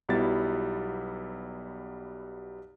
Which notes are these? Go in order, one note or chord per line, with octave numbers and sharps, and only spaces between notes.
B1 F#3 G3 B3 E4 A6